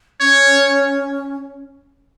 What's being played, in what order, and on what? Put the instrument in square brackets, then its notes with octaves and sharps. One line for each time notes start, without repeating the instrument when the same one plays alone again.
[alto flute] C#4 [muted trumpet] C#5